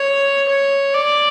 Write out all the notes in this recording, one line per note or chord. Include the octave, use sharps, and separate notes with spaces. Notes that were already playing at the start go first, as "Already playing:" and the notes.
Already playing: C#5
C#5
D5